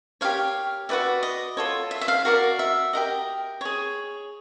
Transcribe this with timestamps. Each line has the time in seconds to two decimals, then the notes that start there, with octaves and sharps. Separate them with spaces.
0.21 G4 A#4 C#5 F5
0.89 F#4 B4 D5 E5
1.23 D#5
1.57 F4 A4 C#5
1.91 E5
2.01 E5
2.08 F5
2.25 F#4 A#4 D5 F5
2.59 E5
2.93 G4 A#4 D#5
3.61 G#4 C#5